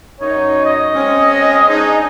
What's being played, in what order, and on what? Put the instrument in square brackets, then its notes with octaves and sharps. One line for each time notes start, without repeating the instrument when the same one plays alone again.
[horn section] F#2 D#4 [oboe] C#5
[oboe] D#5
[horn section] G#3 C4 C#4
[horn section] D4 D#4 [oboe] G#4